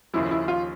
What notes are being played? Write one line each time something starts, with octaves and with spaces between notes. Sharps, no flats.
D#2 C#3 F3 E4
E4
F4